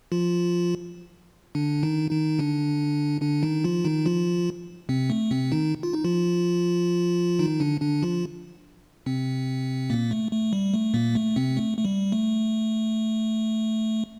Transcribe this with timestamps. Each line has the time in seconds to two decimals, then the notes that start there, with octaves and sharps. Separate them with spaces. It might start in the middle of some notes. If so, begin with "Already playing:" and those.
0.12 F3 F4
1.55 D3 D4
1.83 D#3 D#4
2.11 D#3 D#4
2.39 D3 D4
3.22 D3 D4
3.43 D#3 D#4
3.64 F3 F4
3.85 D#3 D#4
4.06 F3 F4
4.89 C3 C4
5.10 A3
5.31 C3 C4
5.52 D#3 D#4
5.83 F4
5.93 D#4
6.04 F3 F4
7.39 D#3 D#4
7.60 D3 D4
7.81 D3 D4
8.02 F3 F4
9.06 C3 C4
9.90 A#2 A#3
10.11 A3
10.32 A3
10.53 G3
10.74 A3
10.94 A#2 A#3
11.15 A3
11.36 C3 C4
11.57 A3
11.79 A3
11.85 G3
12.12 A3